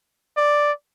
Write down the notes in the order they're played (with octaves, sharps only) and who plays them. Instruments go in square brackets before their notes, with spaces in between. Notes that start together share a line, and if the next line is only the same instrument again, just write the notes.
[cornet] D5